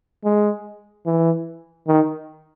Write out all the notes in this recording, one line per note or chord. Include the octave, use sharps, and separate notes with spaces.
G#3
E3
D#3